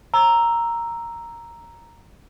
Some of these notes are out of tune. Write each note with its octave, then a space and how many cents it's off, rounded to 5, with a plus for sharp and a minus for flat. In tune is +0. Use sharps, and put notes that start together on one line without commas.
A#5 +0 E6 +5